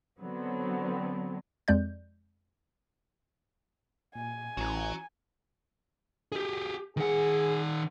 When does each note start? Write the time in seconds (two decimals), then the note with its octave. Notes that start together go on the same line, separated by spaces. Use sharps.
0.20 D3 F#3 B3 C4
1.68 F2 G#3 D5 G6
4.15 A#2 G#5
4.57 A1 E3 C#4 F#4 A#5
6.32 G4 G#4
6.97 D#3 G#4 F#5